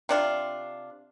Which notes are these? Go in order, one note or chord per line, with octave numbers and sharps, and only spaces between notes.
C3 D4 F4